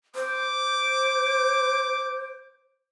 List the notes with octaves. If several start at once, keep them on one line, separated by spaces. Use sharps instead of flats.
C5 D6